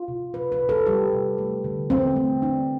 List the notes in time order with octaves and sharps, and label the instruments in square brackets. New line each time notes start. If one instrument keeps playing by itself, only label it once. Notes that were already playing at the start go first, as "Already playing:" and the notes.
Already playing: [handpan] F4
C3
C3 B4
B4
C3
A4
G3 G4
C3
A3
D3
D3 C4
A3
A3 D4